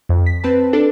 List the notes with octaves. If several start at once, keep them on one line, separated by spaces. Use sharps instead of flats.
F2
B6
C4 B4 A5
D4 A4